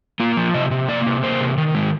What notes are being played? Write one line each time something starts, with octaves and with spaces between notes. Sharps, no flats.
A#3 F4
F3
C3 D#5
C3
A#3 D5
C3
A#3 C5
C3
D#3
G#3